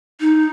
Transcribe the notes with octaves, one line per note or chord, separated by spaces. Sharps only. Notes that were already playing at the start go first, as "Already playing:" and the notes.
D#4